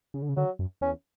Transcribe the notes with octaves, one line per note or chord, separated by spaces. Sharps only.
C#3
D3
C#3
D3 F#3
F#2
E2 C#4